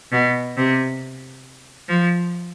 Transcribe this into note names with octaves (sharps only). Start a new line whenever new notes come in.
B2
C3
F3